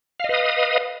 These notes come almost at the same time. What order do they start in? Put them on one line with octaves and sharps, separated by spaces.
F5 D#5 B4 D#6